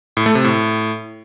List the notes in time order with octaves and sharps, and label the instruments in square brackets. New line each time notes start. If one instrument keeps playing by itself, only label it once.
[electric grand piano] A2
A3
C3
A2